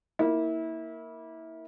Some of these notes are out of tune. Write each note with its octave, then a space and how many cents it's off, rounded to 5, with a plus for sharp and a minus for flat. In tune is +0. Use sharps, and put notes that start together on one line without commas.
A#3 +0 E4 -25